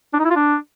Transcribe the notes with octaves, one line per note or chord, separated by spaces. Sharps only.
D4
D#4
E4
F4
D4